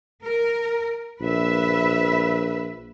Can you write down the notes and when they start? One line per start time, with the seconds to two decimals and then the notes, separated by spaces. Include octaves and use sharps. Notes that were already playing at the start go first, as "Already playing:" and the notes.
0.24 A#4
1.21 A#1 B4 E5